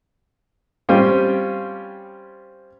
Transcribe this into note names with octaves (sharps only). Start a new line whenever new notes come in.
G3 C4 C#4 F4 G4